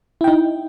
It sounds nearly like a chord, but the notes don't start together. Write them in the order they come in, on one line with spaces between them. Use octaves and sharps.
E4 G5 D#4